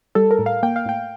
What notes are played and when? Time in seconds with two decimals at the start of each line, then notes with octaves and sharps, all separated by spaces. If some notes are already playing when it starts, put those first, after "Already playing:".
0.15 G3 A4
0.31 A#4
0.39 A2
0.46 F5
0.63 A#3 G5
0.76 F5
0.86 A2 G5